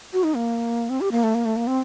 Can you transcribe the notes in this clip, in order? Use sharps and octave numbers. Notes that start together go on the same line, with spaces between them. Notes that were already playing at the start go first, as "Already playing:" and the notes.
F#4
D#4
A#3
C4
G4
A#3
A3
A#3
A3
A#3
C4